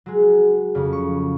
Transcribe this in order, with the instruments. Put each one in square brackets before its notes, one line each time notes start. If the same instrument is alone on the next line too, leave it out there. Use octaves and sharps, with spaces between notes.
[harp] F#3 G#3
F2 C#3
C#6